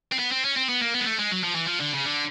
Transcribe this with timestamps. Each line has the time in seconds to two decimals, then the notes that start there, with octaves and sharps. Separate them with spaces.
0.12 C4
0.19 B3
0.31 C4
0.44 C#4
0.56 C4
0.69 B3
0.81 A#3
0.94 B3
1.00 G#3
1.06 A3
1.19 G#3
1.31 F#3
1.44 F3
1.55 E3
1.68 F3
1.81 D3
1.94 C#3
2.06 D3